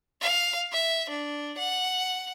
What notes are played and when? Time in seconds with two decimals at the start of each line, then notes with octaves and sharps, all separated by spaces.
0.22 F5
0.73 E5
1.10 D4
1.58 F#5